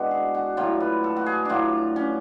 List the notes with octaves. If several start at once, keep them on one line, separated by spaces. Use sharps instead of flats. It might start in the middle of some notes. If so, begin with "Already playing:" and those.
Already playing: B2 G#3 D4 F#4
G#4
F#4
A2 F#3 F4
B4
A4
F#4
G#4
A2 F#3 D4 F4
C#4